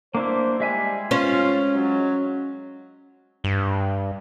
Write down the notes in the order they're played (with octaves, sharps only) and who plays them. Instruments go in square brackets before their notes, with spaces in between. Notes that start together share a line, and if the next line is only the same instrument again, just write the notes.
[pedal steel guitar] A#3 D4 E4 [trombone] C5
[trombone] G3 [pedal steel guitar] G#3 E5 G#5
[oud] C#4 C5 [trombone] F4
[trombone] F#3
[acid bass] G2